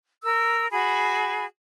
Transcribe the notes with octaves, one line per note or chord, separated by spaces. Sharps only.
A#4 E6
F#4 G#4 B5